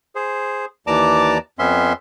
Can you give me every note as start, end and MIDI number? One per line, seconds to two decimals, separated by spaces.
0.15 0.65 68
0.15 0.65 72
0.87 1.38 39
0.87 1.38 52
0.87 1.38 74
0.87 1.38 81
0.87 1.38 82
0.87 1.38 86
1.59 1.93 41
1.59 1.93 59
1.59 1.93 61
1.59 1.93 76
1.59 1.93 84